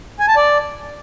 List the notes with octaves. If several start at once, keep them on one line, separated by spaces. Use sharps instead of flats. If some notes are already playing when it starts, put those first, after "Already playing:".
G#5
A5
D5